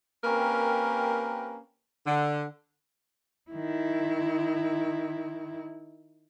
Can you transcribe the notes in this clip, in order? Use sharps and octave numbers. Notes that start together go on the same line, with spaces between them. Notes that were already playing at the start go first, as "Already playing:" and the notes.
A#3 C4 C#4 G4 A#4 B4
D3
D#3 E4